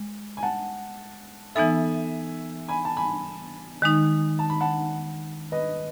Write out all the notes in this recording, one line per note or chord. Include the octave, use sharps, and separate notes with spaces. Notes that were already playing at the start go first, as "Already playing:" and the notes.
Already playing: G#3
G#5
F#5 A5
E3 B3 D#4 A4 E5 G#5
G#5 B5
A5
G#5 B5
D#3 G#3 D#4
A5
B5
F#5 A5
B4 D#5